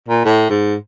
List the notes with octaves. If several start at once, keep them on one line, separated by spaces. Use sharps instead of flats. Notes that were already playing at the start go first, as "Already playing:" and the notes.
A#2
A2
G#2